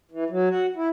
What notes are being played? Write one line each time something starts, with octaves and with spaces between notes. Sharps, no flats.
E3
F#3
F#4
E4